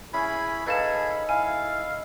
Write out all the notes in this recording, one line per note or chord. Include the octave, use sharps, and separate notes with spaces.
C#4 E4 G#4 B5
D#4 G#4 A4 B4 F5 B5 E7
E4 F5 G#5